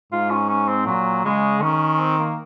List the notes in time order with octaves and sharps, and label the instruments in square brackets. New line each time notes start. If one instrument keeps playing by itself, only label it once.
[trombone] G#2 [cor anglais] F4
[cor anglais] C#4
C#4
C4
[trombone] A#2 [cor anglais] F#3
[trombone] C#3 [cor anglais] G#3
[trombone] D#3 [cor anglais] C#4
[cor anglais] C4
A#3